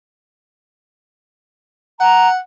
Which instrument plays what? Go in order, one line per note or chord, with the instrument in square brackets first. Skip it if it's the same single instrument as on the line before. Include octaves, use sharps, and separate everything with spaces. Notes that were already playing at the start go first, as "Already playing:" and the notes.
[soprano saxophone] F#5 [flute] A#5